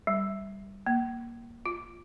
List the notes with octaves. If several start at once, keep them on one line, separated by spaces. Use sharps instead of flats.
G3
A#3
F4